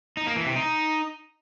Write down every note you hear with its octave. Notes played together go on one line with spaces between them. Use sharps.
D#4
A#3
E3
C3
D#4